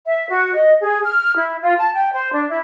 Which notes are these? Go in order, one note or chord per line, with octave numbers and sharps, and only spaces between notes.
E5
F#4
D#5
G#4
F6
E4
F4
A5
G5
C5
D4
E4